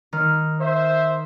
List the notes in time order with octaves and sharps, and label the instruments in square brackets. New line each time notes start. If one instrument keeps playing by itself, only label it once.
[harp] D#3 F6
[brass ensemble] C5 E5